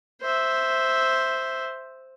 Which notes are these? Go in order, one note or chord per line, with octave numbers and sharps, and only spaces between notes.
C5 E5